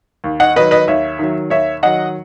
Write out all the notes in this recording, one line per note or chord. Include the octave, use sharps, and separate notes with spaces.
D#2
D#5 F#5
D#3 F#3 B4 D#5
B4 D#5
D#2 C#5 E5
D#3 F#3
D#2 C#5 E5
D#3 F#3 D#5 F#5